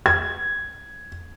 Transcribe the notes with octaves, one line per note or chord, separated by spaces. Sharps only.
G#6